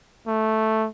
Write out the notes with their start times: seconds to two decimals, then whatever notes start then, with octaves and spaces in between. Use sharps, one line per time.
0.27 A3